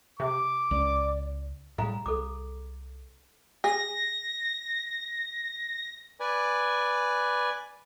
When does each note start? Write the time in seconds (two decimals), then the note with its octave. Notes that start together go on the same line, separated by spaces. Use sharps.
0.20 C3 D6
0.71 C#2 D5
1.78 A2 F#3 G3 G#4 F5 A#5
2.06 C2 A4 D6
3.64 G#4 A#6
6.20 B4 D5 G#5